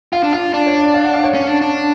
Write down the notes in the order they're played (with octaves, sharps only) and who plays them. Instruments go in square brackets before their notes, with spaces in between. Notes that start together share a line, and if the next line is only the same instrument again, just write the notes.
[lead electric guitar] F4 [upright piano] F5
[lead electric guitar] D4
[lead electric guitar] F4 [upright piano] F5
[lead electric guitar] D4 [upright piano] D5
[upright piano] C#5
D5
F5
F#5
F5
C#5
[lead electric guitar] C#4
D4
D4